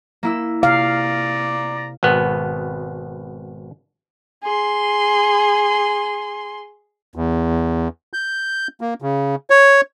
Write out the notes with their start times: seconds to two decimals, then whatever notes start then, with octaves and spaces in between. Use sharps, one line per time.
0.23 A#3 E4 E6
0.63 C3 D5 F5 A#5
2.03 G#1 B2 B3
4.43 G#4 C6
7.16 E2
8.13 G6
8.81 A#3
9.02 C#3
9.50 C#5